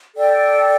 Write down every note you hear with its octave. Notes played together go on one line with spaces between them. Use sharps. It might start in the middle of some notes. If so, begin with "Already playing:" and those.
A4 D5 G5